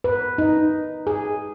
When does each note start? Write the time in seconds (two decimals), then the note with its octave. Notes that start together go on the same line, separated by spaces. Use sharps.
0.04 B4
0.38 D#4
1.07 G#4